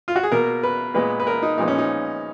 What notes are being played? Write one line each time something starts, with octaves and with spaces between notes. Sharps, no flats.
F4
F#4
G#4
B2 A#3 A#4
B4
A#2 G#3 B3 B4
B4
A#4
D#4
A#2 F3 G#3 B3 D#4
C#4
D#4